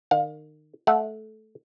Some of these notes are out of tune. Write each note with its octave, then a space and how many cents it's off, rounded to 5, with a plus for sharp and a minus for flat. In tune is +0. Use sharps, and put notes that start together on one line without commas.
D#3 -30 F5 +30
A3 -15 F#5 -25